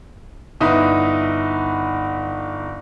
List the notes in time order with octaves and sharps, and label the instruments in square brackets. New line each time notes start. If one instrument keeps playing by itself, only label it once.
[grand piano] G1 D#4 E4 B4 B5 D#6